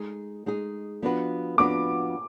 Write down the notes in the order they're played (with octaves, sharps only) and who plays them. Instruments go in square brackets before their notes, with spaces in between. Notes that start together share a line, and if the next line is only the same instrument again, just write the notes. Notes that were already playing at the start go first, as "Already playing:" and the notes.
Already playing: [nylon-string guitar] G#3 D#4 G#4
G#3 D#4 G#4
F3 B3 D4 F#4 B4
[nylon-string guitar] F3 B3 D4 F#4 B4 [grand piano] D6